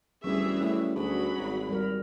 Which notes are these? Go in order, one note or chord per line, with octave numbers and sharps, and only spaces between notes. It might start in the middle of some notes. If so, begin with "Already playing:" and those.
D1 E3 F#3 G3 C#4 G#4 E5
A2
D2 F#3 G#4 B5
G#1
G3 A#4